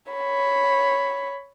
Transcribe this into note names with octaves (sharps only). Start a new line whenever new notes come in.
C#5 B5